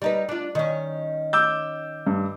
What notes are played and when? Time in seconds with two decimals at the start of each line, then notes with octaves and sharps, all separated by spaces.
0.02 G3 D#4 B4
0.29 D4 F4
0.55 D#3 C#4
1.33 D6 E6 G6
2.06 G2